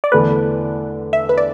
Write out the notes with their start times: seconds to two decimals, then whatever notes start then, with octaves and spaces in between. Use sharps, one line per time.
0.04 D5
0.12 E2 D3 A3 D4 A4 B4
1.13 E5
1.29 B4
1.37 D5